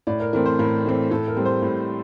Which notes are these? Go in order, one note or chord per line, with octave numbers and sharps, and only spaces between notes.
A2 D5
A#4
E3 A3 C4 A#4
C5
A2 A#4
E3 A3 C4
A2 A4
A#4
G3 C4
C5
A2